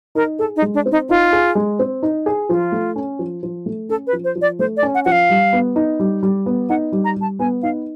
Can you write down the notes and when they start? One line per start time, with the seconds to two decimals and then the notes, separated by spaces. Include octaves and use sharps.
0.15 D#4 A#4
0.39 G#4 A4
0.56 D#4
0.62 G#3
0.74 D4
0.86 C4
0.92 D#4
1.09 D#4 F4
1.33 G#4
1.55 G#3
1.79 C4
2.03 D#4
2.26 G#4
2.49 F3 F4
2.72 A3
2.96 C#4
3.19 F3
3.43 F3
3.66 A3
3.89 C#4 A4
4.07 B4
4.13 F3
4.24 C5
4.36 F3
4.41 D5
4.59 A3 C5
4.77 D5
4.83 C#4
4.95 F#5
5.05 F3 F#5
5.12 F5
5.30 G3
5.53 B3
5.76 D#4
6.00 G3
6.23 G3
6.46 B3
6.69 D#4 F#5
6.92 G3
7.05 A#5
7.16 G3
7.21 A5
7.39 B3 G#5
7.63 D#4 F5